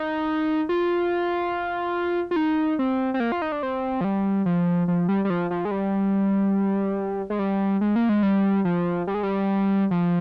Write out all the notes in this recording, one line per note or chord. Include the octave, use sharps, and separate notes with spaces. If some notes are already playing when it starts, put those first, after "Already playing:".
Already playing: D#4
F4
F4
D#4
C4
C4
A#3
F4
D#4
D4
C4
F3
G3
F3
F3
G3
G3
F3
F3
G#3
G3
G#3
G3
G#3
A#3
G#3
G3
F3
G3
G#3
G3
F3